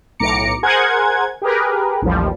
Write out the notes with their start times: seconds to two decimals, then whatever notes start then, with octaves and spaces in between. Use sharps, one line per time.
0.20 B1 A2 A#5 D6 C#7
0.63 G#4 A#4 C5 F#5 G#5 G#6
1.42 G4 G#4 A#4 B4
2.02 A1 D#2 F3 G3